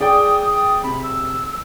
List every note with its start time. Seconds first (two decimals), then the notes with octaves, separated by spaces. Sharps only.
0.01 G#4 D5 G5 D#6
0.53 D#6
0.83 C3 B5
1.04 E6